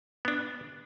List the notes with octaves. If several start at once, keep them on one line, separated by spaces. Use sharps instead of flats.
B3 D4